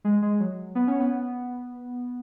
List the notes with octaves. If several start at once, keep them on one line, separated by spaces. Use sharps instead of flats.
G#3
G#3
F#3
B3
C#4
B3